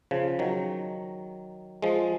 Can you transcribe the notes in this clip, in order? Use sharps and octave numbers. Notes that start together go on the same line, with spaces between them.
C#3 F3
D#3 F#3
F3 G#3